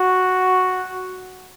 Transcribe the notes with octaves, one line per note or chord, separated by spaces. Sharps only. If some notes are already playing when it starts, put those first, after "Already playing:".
Already playing: F#4